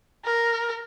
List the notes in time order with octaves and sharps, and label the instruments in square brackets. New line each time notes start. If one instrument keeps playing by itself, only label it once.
[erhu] A#4